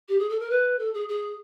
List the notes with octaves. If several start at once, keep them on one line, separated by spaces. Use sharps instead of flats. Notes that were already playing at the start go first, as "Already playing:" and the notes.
G4
G#4
A4
A#4
B4
A4
G#4
G#4